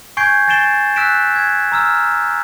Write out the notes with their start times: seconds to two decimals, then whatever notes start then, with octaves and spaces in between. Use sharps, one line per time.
0.17 G#5 C#6 G6 G#6 C7 D7
0.48 G#5 A6 C7 D7 E7 G7
0.96 E6 F#6 A#6 B6 D7 E7
1.36 G#6
1.72 A#5 E6 F6